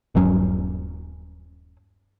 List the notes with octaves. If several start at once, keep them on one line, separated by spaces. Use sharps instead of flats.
D#1 G2 F#3 C#4